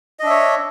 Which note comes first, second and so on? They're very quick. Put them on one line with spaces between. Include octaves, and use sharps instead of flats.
D#5 D4 E5 C#5